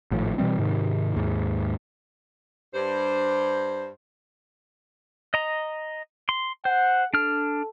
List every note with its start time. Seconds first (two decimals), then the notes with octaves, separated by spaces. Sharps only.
0.11 G#1 A2 F3
0.38 B2 E3 G3 C4
0.59 G#2 C3 D#3
1.16 D#2 G#2
2.74 G2 C5
5.34 D#5 A#5
6.29 C6
6.65 C5 F#5
7.14 D4 A4 F6